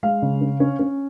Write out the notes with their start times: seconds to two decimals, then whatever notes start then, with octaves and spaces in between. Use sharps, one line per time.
0.03 G#3 F5
0.22 C#3
0.41 C#4
0.60 C#4
0.79 C#4